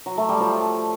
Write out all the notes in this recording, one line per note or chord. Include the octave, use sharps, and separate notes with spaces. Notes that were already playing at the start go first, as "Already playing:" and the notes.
F#3
A3
G3
F3